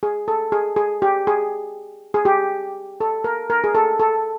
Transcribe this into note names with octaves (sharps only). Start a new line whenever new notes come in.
G#4
A4
G#4
G#4
G4
G#4
G#4
G4
A4
A#4
A#4
G#4
A4
A4